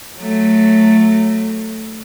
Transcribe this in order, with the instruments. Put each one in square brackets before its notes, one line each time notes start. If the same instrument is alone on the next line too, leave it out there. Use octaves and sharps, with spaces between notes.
[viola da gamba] F#3 A3